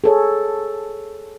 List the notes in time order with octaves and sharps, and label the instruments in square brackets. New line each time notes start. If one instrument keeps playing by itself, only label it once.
[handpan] G#4 A4 C#5